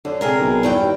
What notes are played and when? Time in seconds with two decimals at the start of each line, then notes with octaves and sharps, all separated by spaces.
0.05 F#2 D3
0.21 C3 G#4 A#4
0.40 B1
0.63 E2 G2 G5
0.78 D#2